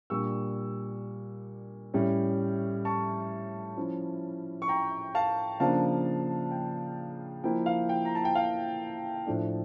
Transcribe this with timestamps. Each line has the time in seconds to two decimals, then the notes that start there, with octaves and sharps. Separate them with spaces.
0.10 A#2 G3 D4 C#6 E6
1.94 A2 G3 C#4
2.85 A5 C#6
3.77 F3 C#4 E4
4.62 C#6
4.68 G5 A#5
5.15 F5 A5
5.60 C#3 F3 A#3 D4 F5 A5
6.51 G5
7.44 F3 A#3 E4 G5
7.66 F5
7.89 G5
8.05 A#5
8.15 A5
8.25 G5
8.35 F5
9.27 A2 F3 A3 D4